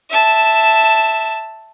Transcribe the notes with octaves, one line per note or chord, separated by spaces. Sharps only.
E5 A5